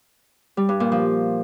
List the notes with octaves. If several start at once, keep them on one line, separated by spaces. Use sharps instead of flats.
G3
G2
A#2
F3